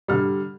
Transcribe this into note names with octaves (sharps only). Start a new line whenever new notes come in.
D3 G3 F6